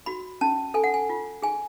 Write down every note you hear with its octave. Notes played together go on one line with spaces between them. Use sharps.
F#4 B5
C#4 A5
A4 G#5
F#5
G#5
F4
G#4 G#5